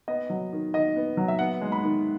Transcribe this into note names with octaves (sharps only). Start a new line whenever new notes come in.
B3 D#5
F#3
D#3
D#3 D#5
B3
F#3
E5
B3 F#5
G#3
B5
D#3